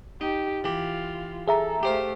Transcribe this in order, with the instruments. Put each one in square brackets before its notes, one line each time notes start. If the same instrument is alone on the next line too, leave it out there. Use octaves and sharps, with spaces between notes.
[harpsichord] D#4 [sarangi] G4
[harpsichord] E3 G4 [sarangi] F4
[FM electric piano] G#4 E5 A#5 [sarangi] A4
[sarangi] A3 [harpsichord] G4 C5 F5